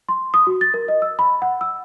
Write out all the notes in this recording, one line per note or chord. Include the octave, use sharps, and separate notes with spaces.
C6
D#6
F#4
A6
A#4
D#5
E6
B5
F#5
E6